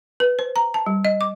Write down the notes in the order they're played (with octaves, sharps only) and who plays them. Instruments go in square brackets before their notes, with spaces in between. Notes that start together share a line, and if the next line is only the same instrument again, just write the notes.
[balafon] B4
C5
A#5
A5
G3
D#5
D6